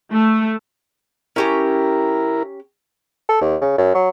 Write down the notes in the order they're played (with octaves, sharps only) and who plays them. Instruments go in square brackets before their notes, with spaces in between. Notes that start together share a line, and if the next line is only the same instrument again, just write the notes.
[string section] A3
[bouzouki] C#4 G4 A#5 [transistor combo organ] E4 A#4
[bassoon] A4
D#2
C#3
F#2
F#3